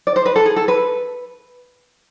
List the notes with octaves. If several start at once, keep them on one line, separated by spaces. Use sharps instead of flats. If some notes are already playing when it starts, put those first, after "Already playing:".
D5
C5
B4
A4
G#4
A4
B4